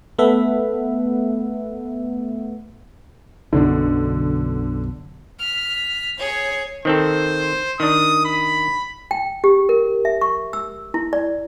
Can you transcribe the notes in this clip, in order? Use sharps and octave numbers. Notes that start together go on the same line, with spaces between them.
A3 B3 A4 B4 E5 F#5
B1 F#2 B2 D3
F6 B6
G#4 C#5
D#3 C4 A4 C5
D#3 D4 D#6
B5
G5
G4
A#4
E5
C#6
E6
E4
D5